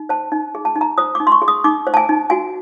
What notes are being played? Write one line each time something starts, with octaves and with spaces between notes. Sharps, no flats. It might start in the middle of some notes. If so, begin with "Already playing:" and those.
Already playing: D#4
C5 A5
D#4
G#4
A5
D#4
A#5
C5 D#6
D#4 D6
C6
C#6
G#4
D#6
D#4 D6
C5
A5
G#5
D#4
F#4 G#5